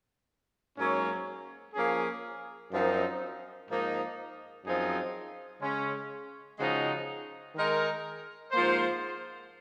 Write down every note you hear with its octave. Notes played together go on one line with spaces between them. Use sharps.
G#2 F#3 A#3 C#4
F3 A#3 C#4 G#4
F#2 F3 C4 D#4 A#4
G#2 F3 A#3 D#4
F#2 F3 C4 D#4 G#4
C#3 G#3 C#4
C#3 F3 G#3 D#4 F#4
D#3 G#3 D#4 A#4
G#2 F3 A#3 F4 C5